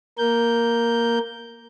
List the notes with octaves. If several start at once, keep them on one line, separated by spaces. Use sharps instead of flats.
A#3 A#4 G6